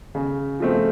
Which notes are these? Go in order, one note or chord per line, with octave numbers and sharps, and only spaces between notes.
C#3
F3 A3 C4